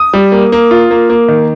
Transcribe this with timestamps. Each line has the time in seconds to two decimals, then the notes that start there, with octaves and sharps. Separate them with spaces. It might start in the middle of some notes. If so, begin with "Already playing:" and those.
Already playing: D#6
0.13 G3
0.32 A#3
0.52 A#3
0.71 F4
0.91 A#3
1.10 A#3
1.28 D#3